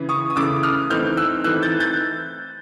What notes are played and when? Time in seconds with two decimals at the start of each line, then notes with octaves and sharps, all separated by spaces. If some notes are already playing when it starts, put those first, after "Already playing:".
Already playing: C#3 E3
0.09 C#6 D#6
0.30 D#6
0.36 C#3 E3 A3 D6 E6
0.63 D#6 F6
0.90 E3 A3 C4 D#4 F6 G6
1.17 E6 F#6
1.44 E3 A3 C4 D#4 E6 F#6
1.62 G6 A6
1.80 G6 A6